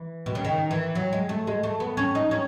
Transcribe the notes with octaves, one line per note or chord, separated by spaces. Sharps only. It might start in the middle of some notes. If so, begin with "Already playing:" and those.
Already playing: E3
B2
C#3
D#3
E3
F#3
G#3
A3
G#3
A3
B3
C#4
D#4
C#4